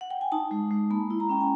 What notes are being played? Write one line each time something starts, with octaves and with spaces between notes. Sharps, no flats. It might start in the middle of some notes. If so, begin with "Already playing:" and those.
F#5
G5
G#5
D#4 A5
G#3
G#3
A#3 B5
E4
A#5
C#4 G5
G#5